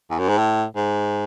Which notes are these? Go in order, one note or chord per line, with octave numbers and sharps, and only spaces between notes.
E2
F#2
G#2
A2
G#2